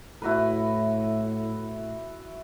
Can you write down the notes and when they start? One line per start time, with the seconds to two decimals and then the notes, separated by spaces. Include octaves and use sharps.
0.22 A2 E4 F#4 B4